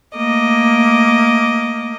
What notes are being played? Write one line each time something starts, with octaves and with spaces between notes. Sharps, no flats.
A3 A#3 D#5 D6